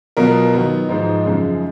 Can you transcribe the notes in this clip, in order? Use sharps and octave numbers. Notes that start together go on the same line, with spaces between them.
B2 F#3 B3 F4 A#4
D#3 F#3 B3
G#2 F3 G#3 D#4
F#2 C#3 F3 G#3